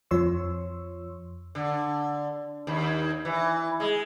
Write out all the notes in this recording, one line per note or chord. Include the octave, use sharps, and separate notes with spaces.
F2 F3 C#5 C6 C#6 E6
D3
D#2
E3
G#3